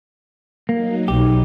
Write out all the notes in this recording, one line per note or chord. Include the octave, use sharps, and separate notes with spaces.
F#3 A#3 D#4
B1 G4